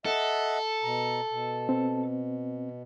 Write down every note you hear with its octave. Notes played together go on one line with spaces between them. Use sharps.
A4 D#5 E5 F#5
B2 A#5
B2
C4